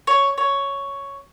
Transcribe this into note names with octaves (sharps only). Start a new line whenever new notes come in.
C#5
C#5